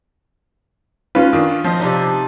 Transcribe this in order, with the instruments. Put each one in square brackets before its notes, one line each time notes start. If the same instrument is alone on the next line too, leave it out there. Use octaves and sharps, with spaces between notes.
[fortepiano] C#4 F4 [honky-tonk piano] B4
[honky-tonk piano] D#3 D4
[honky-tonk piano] F3 [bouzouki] C4 D#5
[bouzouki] C3 D4 D#4